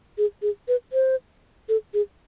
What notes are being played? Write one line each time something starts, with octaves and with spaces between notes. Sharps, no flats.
G#4
G#4
B4
C5
A4
G#4